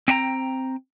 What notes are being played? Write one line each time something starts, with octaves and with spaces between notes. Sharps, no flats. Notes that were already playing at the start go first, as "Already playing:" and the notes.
C4 D4 G5 A#5